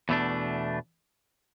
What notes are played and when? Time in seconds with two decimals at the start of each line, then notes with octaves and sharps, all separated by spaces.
0.09 E2 B2 A3 D4